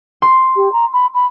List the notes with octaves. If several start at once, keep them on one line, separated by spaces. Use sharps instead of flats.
C6
G4
A#5
B5
B5